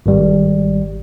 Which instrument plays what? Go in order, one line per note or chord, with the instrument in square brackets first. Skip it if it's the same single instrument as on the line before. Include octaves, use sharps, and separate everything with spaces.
[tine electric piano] G#1 G3